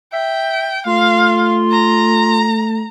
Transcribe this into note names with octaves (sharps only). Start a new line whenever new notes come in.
E5 G5
A3 F4 F5 C6
A#5